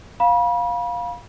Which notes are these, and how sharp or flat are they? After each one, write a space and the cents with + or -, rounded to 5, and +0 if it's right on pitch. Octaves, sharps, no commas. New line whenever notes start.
F5 +15 B5 -35